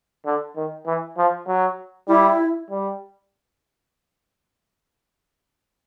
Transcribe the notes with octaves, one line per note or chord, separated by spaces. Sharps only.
D3
D#3
E3
F3
F#3
G3 E4
G3